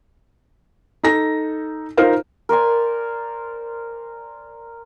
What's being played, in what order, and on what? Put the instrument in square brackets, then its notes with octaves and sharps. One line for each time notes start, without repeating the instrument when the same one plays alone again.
[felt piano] D#4 A4 A#6
D#4 F4 A#4 C5 F5
[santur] A#4 C5 D5 G#5